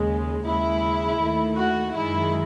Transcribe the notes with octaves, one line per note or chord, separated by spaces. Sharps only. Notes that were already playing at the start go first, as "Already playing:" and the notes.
Already playing: D#2 C#3 G#3
D#2 C#3 G#3 E4
D#2 D#3 A3
F#4
F#2 D#3 G#3 E4